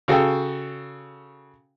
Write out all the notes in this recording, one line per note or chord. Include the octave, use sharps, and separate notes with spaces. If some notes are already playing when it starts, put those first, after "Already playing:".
C#3 F#4 A4 G5